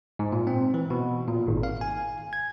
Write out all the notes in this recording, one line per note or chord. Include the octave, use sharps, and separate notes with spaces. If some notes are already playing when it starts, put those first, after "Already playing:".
G#2
A#2
C4
E3
B2
A#2
G#1
F5
G#5
G#6